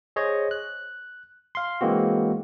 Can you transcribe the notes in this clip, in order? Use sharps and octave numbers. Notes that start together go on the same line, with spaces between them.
G#4 C5 C#5 D#5
F#6
F5 C6
E3 G#3 A#3 C4 F#4